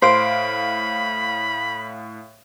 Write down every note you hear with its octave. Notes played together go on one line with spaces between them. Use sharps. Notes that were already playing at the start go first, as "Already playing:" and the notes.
A2 C5 F5 B5 D7